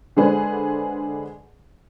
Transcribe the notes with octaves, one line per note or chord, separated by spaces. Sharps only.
D3 G#3 D4 G#4 B4 C5